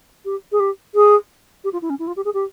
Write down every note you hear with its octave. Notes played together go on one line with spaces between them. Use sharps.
G4
G#4
G4
G#4
G4
F4
E4
C#4
E4
F4
G4
G#4
G4